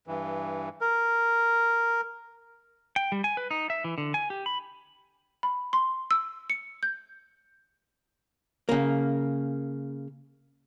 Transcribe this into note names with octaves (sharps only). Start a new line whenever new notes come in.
G2 E3
A#4
G5
G3
G#5
B4
D#4
E5
E3
D3
G#5
G4
B5
B5
C6
E6
C#7
G6
C#3 A#3